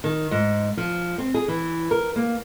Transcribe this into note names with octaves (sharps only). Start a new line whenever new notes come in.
D#3
G#2
F3
C4
G#4
E3
A#4
A#3